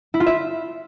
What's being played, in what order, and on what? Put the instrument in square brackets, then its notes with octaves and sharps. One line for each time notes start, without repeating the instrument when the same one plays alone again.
[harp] E4
F4
E5